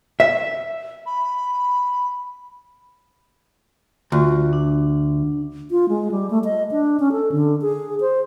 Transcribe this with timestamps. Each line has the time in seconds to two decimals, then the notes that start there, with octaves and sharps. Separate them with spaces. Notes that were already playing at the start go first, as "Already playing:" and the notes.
0.20 E5
1.06 B5
4.12 D2 F4
4.53 D4
5.71 F4
5.89 G#3
6.11 G3
6.30 A3
6.44 D#5
6.71 D4
7.00 C#4
7.12 A4
7.32 D3
7.61 G#4
8.01 C5